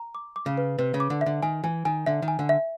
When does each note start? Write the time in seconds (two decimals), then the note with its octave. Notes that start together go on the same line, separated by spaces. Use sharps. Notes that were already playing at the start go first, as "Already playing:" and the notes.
Already playing: A#5
0.15 D6
0.36 D6
0.46 C#3
0.58 B4
0.78 C3 B4
0.94 C#3
1.00 D6
1.10 D3
1.21 E5
1.26 D3
1.43 D#3 G#5
1.64 E3 G#5
1.85 D#3 G#5
2.06 D3 E5
2.22 D#3
2.28 G#5
2.39 D3
2.49 E5